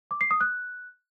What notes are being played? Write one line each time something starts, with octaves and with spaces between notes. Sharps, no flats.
D6
C7
D#6
F#6